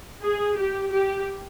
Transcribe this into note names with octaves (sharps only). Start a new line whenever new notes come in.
G#4
G4
G4